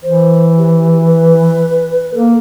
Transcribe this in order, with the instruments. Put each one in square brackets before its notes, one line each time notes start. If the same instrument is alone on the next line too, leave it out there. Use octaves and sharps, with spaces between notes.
[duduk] E3 [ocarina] C5
[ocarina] G4
B4
[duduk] A#3 [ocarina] A4